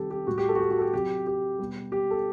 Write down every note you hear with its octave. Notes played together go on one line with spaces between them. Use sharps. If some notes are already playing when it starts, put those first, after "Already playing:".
Already playing: C3 D#3 G3 G4 A4
G4
A2 G3 F#4
G4
A4
F#4
G4
F#4
A4
G4
C3 F#3 G4
G4
B2 G3
G4
A4